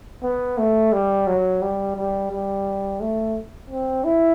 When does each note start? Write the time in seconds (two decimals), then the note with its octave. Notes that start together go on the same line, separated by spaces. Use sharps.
0.23 B3
0.58 A3
0.93 G3
1.27 F#3
1.62 G3
1.96 G3
2.31 G3
3.01 A3
3.70 C4
4.04 E4